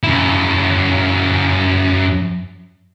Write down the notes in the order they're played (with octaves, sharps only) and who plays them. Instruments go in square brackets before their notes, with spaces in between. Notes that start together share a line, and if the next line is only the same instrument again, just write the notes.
[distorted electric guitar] F#2 E4